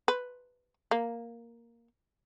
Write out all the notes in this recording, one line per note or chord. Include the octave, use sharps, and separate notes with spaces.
B4
A#3